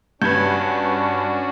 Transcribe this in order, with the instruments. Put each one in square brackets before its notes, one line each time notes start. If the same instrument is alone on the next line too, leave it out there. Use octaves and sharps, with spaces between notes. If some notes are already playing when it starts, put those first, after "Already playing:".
[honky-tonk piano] G2 B4 [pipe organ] C#4 D4 F#4 [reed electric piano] G6 G#6